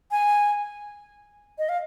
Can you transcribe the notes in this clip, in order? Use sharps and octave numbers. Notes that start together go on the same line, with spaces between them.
G#5
D#5
F5